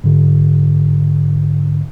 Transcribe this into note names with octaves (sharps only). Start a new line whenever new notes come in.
G#2 D3